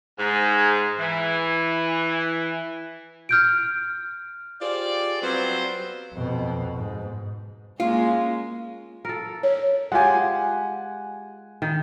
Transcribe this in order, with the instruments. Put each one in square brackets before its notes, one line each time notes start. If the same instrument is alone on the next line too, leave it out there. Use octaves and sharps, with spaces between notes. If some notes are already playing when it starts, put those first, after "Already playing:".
[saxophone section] G#2
E3
[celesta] F6 G6 D7
[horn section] F4 G4 G#4 C5 D5
F#3 G3 B3 C4 F4 C5
[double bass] F2 B2
G#2
[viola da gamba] G#3 A#3 C#4 [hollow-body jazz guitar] F4
[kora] A4 A#4
[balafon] C#5
[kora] G#3 F4 G4 [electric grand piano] F#5 G#5
[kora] D#3